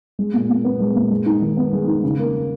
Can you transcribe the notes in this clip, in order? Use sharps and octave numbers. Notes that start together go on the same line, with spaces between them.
G#3
A#2
A#2
B3
G#3
A#2
G#3
D#4
D#3
B3
G#3
D#4
C#3
A#3